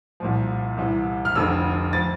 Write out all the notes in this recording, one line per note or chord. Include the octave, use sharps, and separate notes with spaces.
C2 A#2 F3
C2 C3 E3
F6
F1 F2 D3 F3 E6
F3 A6